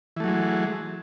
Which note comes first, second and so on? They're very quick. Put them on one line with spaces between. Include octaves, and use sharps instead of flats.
E3 A3 F#3 G#3